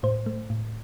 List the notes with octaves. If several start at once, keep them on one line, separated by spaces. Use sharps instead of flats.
A2 C5
A3
A2